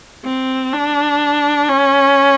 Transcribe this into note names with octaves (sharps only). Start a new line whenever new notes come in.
C4
D4
C#4